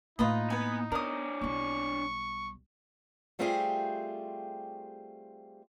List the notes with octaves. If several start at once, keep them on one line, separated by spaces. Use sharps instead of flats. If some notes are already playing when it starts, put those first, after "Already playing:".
A2 A#3 D#4 F4 B4 D#5
B3 B4 G#5
B3 D4 A#4 C#5 D#6
B1 G3 C#6
G3 A3 C4 F4 G4 G#4